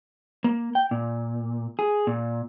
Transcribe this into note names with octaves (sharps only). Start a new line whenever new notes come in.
A#3
G5
A#2
G#4
A#2